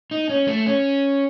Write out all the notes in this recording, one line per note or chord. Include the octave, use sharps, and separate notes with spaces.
D#4
C#4
A3
C#4